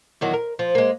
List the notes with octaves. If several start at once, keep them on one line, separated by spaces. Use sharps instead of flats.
E2 D#3 F#3
A#4
F3
G#3 A#3